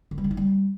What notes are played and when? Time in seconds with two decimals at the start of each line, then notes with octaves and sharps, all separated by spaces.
0.11 D3
0.18 G3
0.24 D3
0.31 D#4
0.37 G3